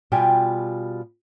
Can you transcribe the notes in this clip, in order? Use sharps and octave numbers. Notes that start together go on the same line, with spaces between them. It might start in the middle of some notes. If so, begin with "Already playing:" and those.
B2 G3 F4 G4 G5 G#5